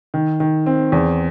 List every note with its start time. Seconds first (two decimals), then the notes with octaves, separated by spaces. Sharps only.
0.14 D#3
0.40 D#3
0.66 C4
0.92 E2